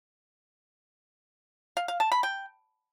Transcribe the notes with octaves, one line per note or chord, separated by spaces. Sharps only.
F5
F5
A5
B5
G5